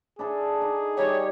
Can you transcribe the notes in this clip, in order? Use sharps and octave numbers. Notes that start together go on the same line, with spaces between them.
D4 E4 G#4 A4
D#4
G3 D#4 G4 C#5